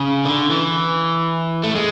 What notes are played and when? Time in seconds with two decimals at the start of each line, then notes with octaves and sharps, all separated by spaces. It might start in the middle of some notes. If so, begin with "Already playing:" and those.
Already playing: C#3
0.25 D3
0.51 E3
1.63 A3
1.75 G#3